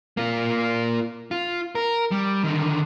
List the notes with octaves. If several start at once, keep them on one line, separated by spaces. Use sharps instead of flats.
A#3 F4
F4
A#4
G3
D3 D#3